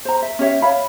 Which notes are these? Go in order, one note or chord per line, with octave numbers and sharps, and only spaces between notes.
C5 A#5
E5
C#4 G4 C#5 E5
C#5 E5 F5 B5